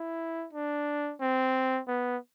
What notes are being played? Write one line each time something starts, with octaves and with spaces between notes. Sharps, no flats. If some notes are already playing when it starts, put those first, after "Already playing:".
Already playing: E4
D4
C4
B3